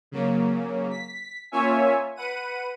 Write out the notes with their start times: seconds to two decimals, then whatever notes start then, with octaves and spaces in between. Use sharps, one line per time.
0.12 C#3 F#3 A#3
0.90 B6
1.52 A#3 C#4 F4 C#5 E5 G#5
2.16 B4 F#5 D#7